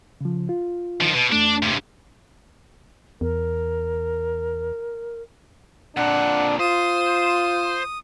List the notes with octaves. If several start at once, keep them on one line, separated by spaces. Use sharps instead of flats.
C#3 F3
F4
D#3 F3
B2
E2 A3 D4
G2 C3
E2 A#4
F2 A#2 D4 F#5
F4 C5 D#6